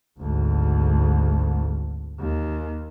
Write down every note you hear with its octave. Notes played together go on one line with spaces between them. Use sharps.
G#1 D2
D#2